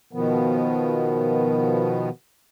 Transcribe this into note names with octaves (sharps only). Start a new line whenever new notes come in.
B2 D#3 F3 B3